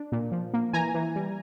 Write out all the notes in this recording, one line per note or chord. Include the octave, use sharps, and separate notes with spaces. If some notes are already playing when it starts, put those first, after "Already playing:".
Already playing: D4
A#2
F3
A#3
E3 G#5 A#5
E3
G3